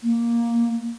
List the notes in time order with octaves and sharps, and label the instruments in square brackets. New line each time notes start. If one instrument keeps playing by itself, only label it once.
[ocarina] A#3